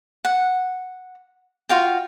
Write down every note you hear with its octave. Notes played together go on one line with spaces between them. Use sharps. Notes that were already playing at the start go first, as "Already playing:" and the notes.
F#5
F4 F#4 F5 G5